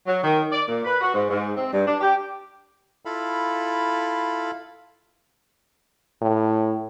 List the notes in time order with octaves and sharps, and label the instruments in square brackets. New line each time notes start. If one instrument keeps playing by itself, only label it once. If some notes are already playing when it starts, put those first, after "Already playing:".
[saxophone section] F#3
D#3
D5
A#2
B4
F#4
G#2
G#2
C4
G2
D4
G4
[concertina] E4 F4 A4 F5 B5
[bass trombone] A2